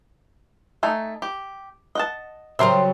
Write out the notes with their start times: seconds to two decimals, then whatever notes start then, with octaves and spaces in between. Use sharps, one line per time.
0.83 A3 D#4 G#5
1.22 G4
1.95 D#5 F#5 A5
2.59 C#3 F#3 G3 A#4 C5 E5